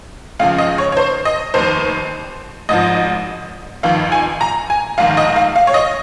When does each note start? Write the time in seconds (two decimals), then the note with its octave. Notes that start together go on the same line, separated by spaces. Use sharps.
0.39 C#2 C#3 F3 F5
0.58 D#5
0.78 C#5
0.92 C#5
0.97 C5
1.25 D#5
1.54 F1 D#2 D#3 C5
2.69 G#1 G#2 F3 D#5
3.83 G1 F2 D#3 F5
4.12 G#5
4.41 A#5
4.70 G#5
4.98 A#1 G#2 D#3 F5
5.17 D#5
5.36 F5
5.56 F5
5.67 C#5
5.74 D#5